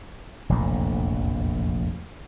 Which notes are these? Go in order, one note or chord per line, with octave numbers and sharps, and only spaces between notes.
F1 A#1 E2 A2